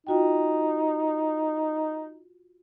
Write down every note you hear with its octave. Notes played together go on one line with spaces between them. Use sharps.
D#4 F4 F#4 G5